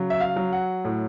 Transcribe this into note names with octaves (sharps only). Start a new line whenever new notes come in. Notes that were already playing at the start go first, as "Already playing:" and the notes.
Already playing: C#3 F#3
E5
F5
F#3
F#5
A2